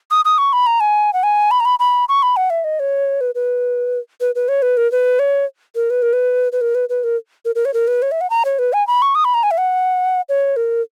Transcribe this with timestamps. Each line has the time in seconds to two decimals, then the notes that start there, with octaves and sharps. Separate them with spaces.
0.11 D#6
0.25 D#6
0.38 C#6
0.53 B5
0.66 A#5
0.80 G#5
1.13 F#5
1.23 G#5
1.51 B5
1.60 A#5
1.65 B5
1.79 B5
2.09 C#6
2.23 B5
2.37 F#5
2.50 E5
2.64 D#5
2.80 C#5
3.21 B4
3.35 B4
4.21 B4
4.35 B4
4.48 C#5
4.62 B4
4.77 A#4
4.92 B4
5.19 C#5
5.75 A#4
5.90 B4
6.02 A#4
6.13 B4
6.52 B4
6.61 A#4
6.75 B4
6.89 B4
7.04 A#4
7.45 A#4
7.55 A#4
7.65 C#5
7.74 A#4
7.88 B4
8.02 C#5
8.12 E5
8.21 F#5
8.30 A#5
8.45 C#5
8.59 B4
8.73 G#5
8.87 B5
9.02 C#6
9.15 D#6
9.25 B5
9.34 A#5
9.43 G#5
9.51 E5
9.58 F#5
10.29 C#5
10.56 A#4